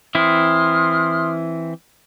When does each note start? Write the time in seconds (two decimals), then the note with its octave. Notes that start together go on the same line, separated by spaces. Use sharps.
0.15 E3 C4 E4 C6 D#6 F6